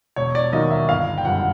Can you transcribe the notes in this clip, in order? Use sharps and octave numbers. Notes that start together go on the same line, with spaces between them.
E1 C#5
D5
D#2 D#3 F#3 A#3 D#5
E5
G1 F5
G5
F#2 D3 G3 F#5